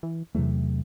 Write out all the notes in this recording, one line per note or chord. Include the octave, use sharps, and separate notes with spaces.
E3
E2 C3 F#3 A3